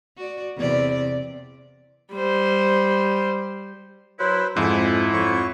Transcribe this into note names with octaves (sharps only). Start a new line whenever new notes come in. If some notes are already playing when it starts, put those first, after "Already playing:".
F#4 D5
E2 C3 D5
G3 C5
F#3 E4 B4 C5
F2 G#2 G#3 E4 A4
F2 C#5 C#6